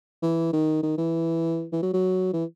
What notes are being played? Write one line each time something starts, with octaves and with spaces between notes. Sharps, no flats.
E3
D#3
D#3
E3
E3
F#3
F#3
E3